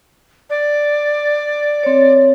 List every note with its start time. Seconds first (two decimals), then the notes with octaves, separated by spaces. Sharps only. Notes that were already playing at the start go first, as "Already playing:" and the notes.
0.50 D5
1.83 C4 C#5